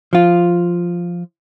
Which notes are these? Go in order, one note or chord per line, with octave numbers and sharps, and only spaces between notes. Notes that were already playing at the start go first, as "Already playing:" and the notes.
F3 F4